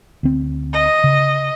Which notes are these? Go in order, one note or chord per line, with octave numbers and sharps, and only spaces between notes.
D2 C4
D#5
C#3